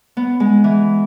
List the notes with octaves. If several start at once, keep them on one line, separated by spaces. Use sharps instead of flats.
B3
G#3
E3